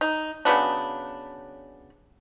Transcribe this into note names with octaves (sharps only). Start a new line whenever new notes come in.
D#4
C#3 F#3 B3 D4